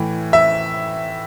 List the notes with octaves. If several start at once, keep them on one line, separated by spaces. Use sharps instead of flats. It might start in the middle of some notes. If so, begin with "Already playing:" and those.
Already playing: A2 E3
E5